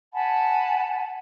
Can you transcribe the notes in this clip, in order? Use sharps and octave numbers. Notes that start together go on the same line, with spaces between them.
F#5 G#5 A5 B5